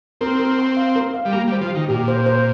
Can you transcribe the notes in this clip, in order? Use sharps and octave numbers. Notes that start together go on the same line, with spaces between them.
C4 A#4
A#4
C6
F5
A#4
F5
G3
A#3 G4
G3
C5
F3
D#3 G4
A#2 G4
C5
C5